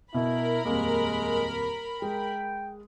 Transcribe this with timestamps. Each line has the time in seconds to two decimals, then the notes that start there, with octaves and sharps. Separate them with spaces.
0.14 B2 E4 A#4 B5
0.65 D#1 F2 G#3 A#3
2.02 G#3 G5